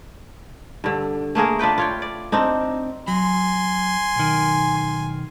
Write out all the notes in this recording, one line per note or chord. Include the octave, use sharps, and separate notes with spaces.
G2 D3
A3 A#3 G#4 A#4
D4 F4 B4 G5
F4 C#5 G5
D5
C4 D4 D#4
F#3 G#5 C6
B1 D#3